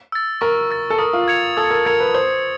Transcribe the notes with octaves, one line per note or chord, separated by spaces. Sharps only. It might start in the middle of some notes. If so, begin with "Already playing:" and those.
E6 A6
A#4 C#6
E6 A6
A4
A#4 D#6
F4
G#6 C#7 F7
A4 D#6
A#4
A#4 G#6 C#7 F7
B4
C5 D#6